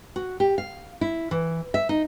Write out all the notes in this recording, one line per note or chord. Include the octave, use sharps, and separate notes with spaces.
F#4
G4
F5
E4
E3
E5
D#4